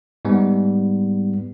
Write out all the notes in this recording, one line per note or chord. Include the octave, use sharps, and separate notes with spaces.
G#2 G3 B3